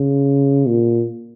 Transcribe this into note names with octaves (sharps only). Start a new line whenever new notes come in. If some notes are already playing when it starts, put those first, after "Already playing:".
Already playing: C#3
A#2